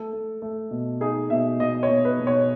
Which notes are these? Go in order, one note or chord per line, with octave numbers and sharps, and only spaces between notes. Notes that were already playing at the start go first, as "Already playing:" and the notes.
Already playing: A3 A4
A3
A3
B2
D#4 G#4
B2 E5
B2 D#5
C#5
B2
B4
B2
C#5